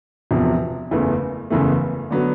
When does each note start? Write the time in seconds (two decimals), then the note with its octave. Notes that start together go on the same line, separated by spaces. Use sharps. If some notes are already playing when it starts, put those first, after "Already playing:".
0.31 E1 E2 C3 F3
0.91 F#1 E2 C#3 E3 A3
1.50 F#1 E2 C#3 E3 A3
2.10 D3 F#3 B3